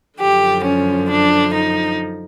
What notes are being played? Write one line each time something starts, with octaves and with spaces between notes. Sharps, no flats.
F#2 D3 F3 G4
C#4
D4
D#4